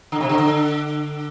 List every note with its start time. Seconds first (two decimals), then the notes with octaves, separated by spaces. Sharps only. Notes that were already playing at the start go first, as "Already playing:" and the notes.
0.12 D3
0.21 C3
0.29 D3
0.40 D3